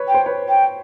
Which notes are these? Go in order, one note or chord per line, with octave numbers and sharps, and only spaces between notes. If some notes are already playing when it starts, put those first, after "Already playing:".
Already playing: B4 C#5
G5
C5
B4 C#5
G5